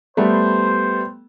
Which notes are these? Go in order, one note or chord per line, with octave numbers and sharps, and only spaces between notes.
G3 A3 B3 C5